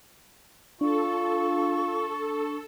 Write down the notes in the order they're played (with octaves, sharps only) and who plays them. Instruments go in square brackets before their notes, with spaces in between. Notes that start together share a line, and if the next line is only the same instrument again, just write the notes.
[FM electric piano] D4 [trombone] F4 [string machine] A4 [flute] C#6